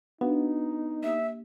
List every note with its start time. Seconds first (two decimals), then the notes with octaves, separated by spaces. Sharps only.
0.21 B3 D4 D#4 F#4 F5
1.03 A#3 G4 E5 D#6